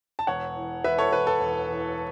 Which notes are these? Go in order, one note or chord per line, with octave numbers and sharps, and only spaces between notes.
A5
E1 C#5 F#5
E3
E1 B4 E5
A4 C#5
E1 B4
A4
E1
E3